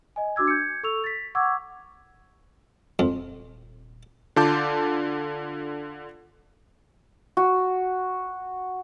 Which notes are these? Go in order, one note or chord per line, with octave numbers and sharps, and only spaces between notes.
D#5 G#5
D4 F#4 D6 E6 G#6
G6 G#6 C#7
A4 C#6 E6 F7
A6 B6
F#5 C#6 D6 E6 G#6
D#1 F2
D3 F4 A5 D6 G6
F#4